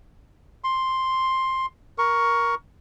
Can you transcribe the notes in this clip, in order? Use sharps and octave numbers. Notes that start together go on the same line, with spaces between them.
C6
A#4 C#6